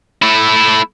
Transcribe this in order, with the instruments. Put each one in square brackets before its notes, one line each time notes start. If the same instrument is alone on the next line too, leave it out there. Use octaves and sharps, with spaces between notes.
[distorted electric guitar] A3 E4